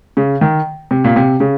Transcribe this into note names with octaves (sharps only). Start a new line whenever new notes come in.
C#3
D#3
C3
A#2
C3
C#3